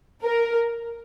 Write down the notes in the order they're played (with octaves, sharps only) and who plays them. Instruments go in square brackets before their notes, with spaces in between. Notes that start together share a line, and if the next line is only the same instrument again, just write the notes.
[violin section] A#4